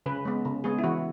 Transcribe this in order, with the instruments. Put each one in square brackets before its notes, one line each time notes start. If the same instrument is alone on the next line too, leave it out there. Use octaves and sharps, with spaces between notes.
[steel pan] C#3 B4
G#3 B3
C#3
G#3 B3 G#4
E4
E3 F#4